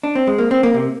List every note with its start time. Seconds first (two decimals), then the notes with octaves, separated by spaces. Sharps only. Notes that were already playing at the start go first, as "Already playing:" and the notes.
0.03 D4
0.15 C4
0.27 G#3
0.38 A#3
0.51 C4
0.63 A#3
0.74 C3